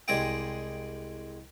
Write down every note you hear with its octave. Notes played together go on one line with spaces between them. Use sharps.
C2 G#3 G#4 D5 D#5 G5